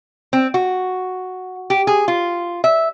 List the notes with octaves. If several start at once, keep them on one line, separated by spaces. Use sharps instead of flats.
C4
F#4
G4
G#4
F4
E5